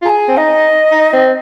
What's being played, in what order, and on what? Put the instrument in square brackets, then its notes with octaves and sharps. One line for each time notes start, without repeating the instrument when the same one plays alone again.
[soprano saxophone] F4
[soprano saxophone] G#4 [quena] A#5
[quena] G#5
[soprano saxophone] C4
[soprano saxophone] D#4 [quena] D#5
[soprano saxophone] D#4
C4